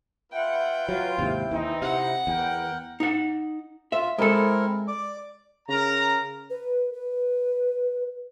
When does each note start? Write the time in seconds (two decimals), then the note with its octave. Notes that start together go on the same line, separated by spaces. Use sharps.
0.32 F4 B4 E5 F#5 G5
0.88 F#3 F4 B4
1.18 D#2 G#2 C3 E4
1.51 D#2 E3 C4 D#4
1.82 C3 F#5
2.27 E2 A#4 B4 G5
3.00 D#4 F#5
3.92 F4 E5
4.18 G#3 C4 E4 A4 A#4
4.88 D5 D6
5.68 C#3 A#4 A#5
6.50 B4
6.93 B4